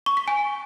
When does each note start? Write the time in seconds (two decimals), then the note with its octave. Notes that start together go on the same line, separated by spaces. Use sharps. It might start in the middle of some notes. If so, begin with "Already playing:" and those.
0.06 C#6
0.17 B6
0.28 G#5